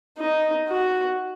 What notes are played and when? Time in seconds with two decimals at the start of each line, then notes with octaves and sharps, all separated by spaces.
0.18 D#4
0.69 F#4